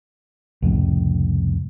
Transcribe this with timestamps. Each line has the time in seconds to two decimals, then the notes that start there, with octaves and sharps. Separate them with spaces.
0.62 C2 F2 A2 C#3